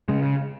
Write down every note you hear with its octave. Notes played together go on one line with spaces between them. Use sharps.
C#3 G#3